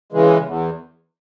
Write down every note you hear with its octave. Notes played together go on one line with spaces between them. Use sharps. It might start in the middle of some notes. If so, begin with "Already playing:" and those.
C#3 E3 G#3
E2